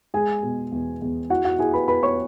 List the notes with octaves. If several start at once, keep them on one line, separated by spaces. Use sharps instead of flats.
G#3 G#4 G#5
B2
E2
E2
E4 F#4 F#5
F#4 F#5
E4 G#4 G#5
B4 B5
E4 B4 B5
C#5 C#6